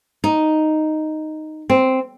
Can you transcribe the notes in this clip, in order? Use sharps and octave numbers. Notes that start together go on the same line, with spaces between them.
D#4
C4